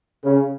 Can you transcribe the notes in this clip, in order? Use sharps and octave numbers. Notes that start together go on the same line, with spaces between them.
C#3